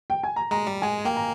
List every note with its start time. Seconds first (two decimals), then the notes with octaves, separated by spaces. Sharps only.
0.10 G5
0.23 G#5
0.36 A#5
0.51 G#3 A#5
0.66 G3
0.82 G#3 G#5
1.05 A#3 G5
1.17 A#5